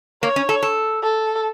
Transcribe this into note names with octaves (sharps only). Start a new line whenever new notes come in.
A#3 C#5
C#4
A4
A4
A4